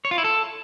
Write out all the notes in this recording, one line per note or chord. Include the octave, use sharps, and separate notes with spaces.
C#5
F4
E4
A4